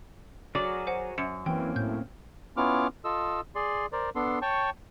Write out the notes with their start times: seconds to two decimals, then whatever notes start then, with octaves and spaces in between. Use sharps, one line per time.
0.55 F#3 F#4 G#4 A#4 D5
0.87 C5 F#5 G#5
1.18 F#2 C#7
1.46 E3 A#3 C4 C#4 G5
1.76 A2 G6
2.57 B3 C#4 E4 F4 D6 F6
3.04 F4 A4 D#5 E6
3.55 G#4 D5 C6
3.93 A#4 C5 D5
4.16 B3 D4 A4 C6
4.42 C#5 G5 A5 C#6